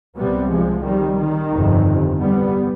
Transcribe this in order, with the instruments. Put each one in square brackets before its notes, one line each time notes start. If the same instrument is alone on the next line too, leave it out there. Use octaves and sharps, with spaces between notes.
[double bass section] C2 C3 G3 B3
F3 G#3
D#3 G3
D#3
G1 F2 C3
G3 B3